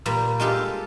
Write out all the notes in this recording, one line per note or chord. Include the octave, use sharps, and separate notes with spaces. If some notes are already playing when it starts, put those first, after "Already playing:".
A#2 G3 A#3 B5
G#3 F4 G4 A4